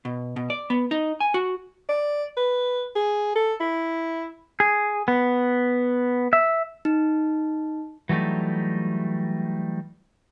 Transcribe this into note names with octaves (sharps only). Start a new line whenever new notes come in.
B2
B2
D5
B3
D#4
G#5
F#4
D5
B4
G#4
A4
E4
G#4
B3
E5
D#4
E3 F#3 G3 A3 D#4